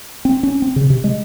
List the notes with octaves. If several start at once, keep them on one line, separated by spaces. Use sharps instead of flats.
C4
C#4
C4
C#3
C3
G#3